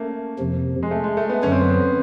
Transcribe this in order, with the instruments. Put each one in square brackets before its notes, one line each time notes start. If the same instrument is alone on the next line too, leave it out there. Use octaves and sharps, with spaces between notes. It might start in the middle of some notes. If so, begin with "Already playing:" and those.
Already playing: [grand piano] A3 A#3 C#4
[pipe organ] F2 C3 F3
[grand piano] G#3
A3
G#3
A3
B3
[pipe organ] F#2 D3 F#3 [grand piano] C#4
[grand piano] C4
B3
C4